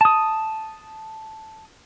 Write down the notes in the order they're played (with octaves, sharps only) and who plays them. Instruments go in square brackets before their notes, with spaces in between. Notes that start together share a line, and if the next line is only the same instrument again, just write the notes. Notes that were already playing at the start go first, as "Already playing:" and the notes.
[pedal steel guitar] A5 D#6